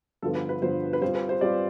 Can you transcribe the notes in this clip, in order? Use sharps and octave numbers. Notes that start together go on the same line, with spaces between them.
G2 D3 F3 B3 A4
B4
B4
G2 D3 F3 B3 C5
B4
G3 C4 F4 C5
B4
C5
G3 C4 F4 D5